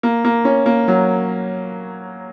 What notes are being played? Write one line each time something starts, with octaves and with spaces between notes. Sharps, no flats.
A#3
A#3
C#4
A#3
F#3